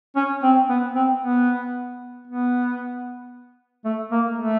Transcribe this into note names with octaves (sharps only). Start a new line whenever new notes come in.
C#4
C4
B3
C4
B3
B3
A3
A#3
A3